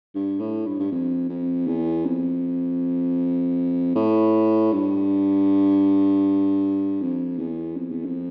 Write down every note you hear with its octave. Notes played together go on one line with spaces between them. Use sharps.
G2
A2
G2
G2
F2
F2
E2
F2
A2
G2
F2
E2
F2
E2
F2